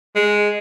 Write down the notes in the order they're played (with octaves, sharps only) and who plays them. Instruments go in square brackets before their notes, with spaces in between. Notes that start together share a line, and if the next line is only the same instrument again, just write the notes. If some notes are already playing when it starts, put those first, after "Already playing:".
[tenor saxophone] G#3